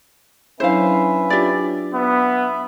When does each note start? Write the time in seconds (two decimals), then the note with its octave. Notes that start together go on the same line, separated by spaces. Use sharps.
0.60 F#3 C#4 D4 E4 B4 C5 E5 F5
1.30 D4 F4 G4 D5 A6
1.94 B3 E5